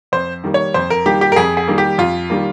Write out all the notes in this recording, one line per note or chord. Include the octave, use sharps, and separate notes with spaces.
F2 C5
D#3 G3 A#3
C#5
F2 C5
A#4
D#3 G3 A#3 G4
G4
A#4
F2 G#4
G#4
D#3 G3 A#3
G4
F2 F4
D#3 G3 A#3